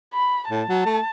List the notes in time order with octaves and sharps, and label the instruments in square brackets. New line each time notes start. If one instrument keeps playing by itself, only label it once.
[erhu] B5
[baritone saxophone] A2 [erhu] A5
[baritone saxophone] F#3
A3